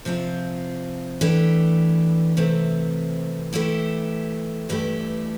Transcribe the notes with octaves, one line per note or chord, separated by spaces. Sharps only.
C3 F3 C4 F4
E3 A3 D4 G4
C3 E3 A3 C4
E3 A3 E4 G4
G2 E3 A3 E4 G4